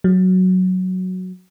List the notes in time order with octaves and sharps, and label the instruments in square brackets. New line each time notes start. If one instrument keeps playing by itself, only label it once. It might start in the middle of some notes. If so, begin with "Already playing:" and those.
[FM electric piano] F#3